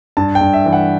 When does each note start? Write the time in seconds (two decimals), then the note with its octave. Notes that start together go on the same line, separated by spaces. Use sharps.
0.17 G2 A5
0.35 G5
0.41 G2
0.53 E5
0.66 E3
0.73 F#5